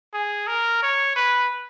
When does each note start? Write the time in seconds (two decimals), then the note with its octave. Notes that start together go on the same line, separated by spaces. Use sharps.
0.13 G#4
0.47 A#4
0.82 C#5
1.16 B4